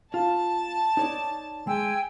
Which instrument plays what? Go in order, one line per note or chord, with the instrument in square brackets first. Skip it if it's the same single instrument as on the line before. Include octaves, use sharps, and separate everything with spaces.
[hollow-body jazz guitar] F4 [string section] A5
[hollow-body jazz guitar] D#4 C#5 D5
[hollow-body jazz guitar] G#3 [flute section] G5 G#5 E6